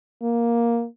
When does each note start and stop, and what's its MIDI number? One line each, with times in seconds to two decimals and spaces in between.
0.22 0.86 58